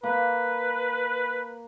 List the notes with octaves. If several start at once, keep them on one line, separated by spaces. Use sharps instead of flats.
A#3 B4